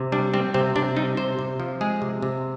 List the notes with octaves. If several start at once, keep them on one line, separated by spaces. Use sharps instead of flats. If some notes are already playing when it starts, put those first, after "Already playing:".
Already playing: C3
G3 D4
G3 C4
C3 C4
C3 D4
G3 D#4
C3 C5
C3
F3
G#3 G#4
C3
C3